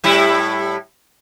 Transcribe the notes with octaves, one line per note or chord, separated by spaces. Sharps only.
A2 G3 E4